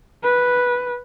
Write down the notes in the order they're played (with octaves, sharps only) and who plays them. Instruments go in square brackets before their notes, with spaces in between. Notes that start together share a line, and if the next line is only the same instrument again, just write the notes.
[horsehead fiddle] B4